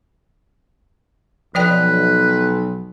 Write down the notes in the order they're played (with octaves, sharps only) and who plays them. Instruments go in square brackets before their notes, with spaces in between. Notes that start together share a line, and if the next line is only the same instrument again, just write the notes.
[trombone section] B1 [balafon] F3 D5 G5 [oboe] B4